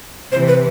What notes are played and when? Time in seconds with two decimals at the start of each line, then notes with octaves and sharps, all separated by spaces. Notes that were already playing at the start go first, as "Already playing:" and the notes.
0.32 C3 E3 C5
0.48 B4